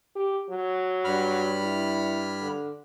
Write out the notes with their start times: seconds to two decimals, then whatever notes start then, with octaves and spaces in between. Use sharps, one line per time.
0.15 G4
0.50 F#3
1.04 G2 B5 F6
1.64 E4
2.41 D3